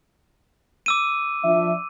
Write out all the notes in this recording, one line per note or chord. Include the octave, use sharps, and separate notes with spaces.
D6 E6 D#7
F3 D4 E5